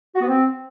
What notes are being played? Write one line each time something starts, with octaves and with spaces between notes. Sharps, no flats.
F#4
B3
C4